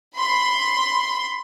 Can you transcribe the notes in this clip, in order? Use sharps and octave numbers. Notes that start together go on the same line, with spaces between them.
B5 C6